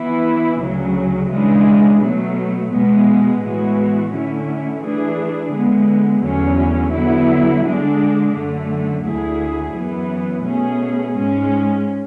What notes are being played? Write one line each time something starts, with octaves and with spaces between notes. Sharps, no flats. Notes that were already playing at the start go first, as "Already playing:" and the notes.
Already playing: E3 B3 E4
D2 C#3 F#3
C#3 E3 G#3 D4
B2 F#3 A3
B2 G#3 B3
A2 E3 G#3 B3 F#4
D3 A3 C#4 E4
E3 A3 D4 G#4
D3 G#3 B3
E2 D3 F#3 A3 C#4
D3 F#3 B3 E4
D3 G#3 D4
F#2 D3 A3
D2 D3 A3 E4 G#4
F#2 E3 B3
B2 A3 C#4 G#4
G#2 G#3 C#4